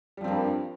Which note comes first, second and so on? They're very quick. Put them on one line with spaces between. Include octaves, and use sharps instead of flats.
G3 F3 C4 A#3 G2